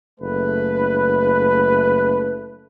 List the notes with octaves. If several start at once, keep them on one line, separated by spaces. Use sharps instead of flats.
F#1 A3 B4